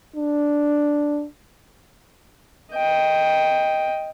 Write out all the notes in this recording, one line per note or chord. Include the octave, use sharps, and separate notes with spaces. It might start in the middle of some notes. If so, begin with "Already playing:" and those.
D4
D#5 G5